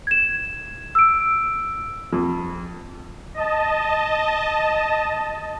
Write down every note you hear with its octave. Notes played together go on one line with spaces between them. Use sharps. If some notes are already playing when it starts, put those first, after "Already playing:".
G#6 E7
E6 D7
F2
D#5 A5